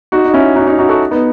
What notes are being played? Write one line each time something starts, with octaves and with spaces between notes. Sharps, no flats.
D#4 F#4
D#4
C#4 E4
D#4 F#4
D#4 F#4
D#4 F#4
F#4 A4
B3 D#4